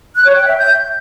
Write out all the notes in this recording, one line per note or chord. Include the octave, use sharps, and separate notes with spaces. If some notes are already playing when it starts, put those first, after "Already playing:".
F#6
C#5
G5
E5
G6